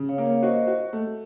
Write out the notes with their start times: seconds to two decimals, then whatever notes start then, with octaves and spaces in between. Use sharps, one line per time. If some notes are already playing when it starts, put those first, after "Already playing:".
Already playing: C#3
0.09 C#5 F5
0.18 A#3
0.26 C#5 F5
0.43 F#4 C5 D#5
0.67 F#4
0.93 A3